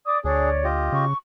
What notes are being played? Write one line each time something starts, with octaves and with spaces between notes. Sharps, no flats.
D5 D6 D#6
D2 D4 G#4 C#5 D5
F4 G4 D#5
C#3 C#6